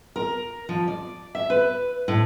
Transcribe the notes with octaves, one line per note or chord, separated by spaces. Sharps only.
A#4
F3
D5
E5
B4
A2